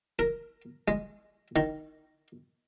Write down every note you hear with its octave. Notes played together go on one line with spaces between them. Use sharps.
A#4
G#3
D#3